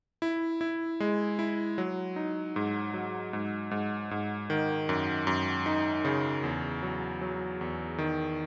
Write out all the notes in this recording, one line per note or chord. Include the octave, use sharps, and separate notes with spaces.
E4
E4
G#3
E4
F#3
D#4
G#2
F#3
G#2
G#2
G#2
D#3
F#2
F#2
D#4
C#3
E2
F#3
F#3
E2
D#3